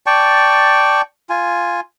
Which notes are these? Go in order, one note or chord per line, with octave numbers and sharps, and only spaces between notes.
D5 G5 A5 C#6
F4 G#5